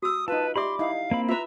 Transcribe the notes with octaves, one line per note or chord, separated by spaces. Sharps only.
F#4 D#6 E6
D#4 F4 B4 A5
G4 D5 E5 B5 C6 D6
D#4 E4 F5
A#3 C4 B5
F4 B4 E5 A#5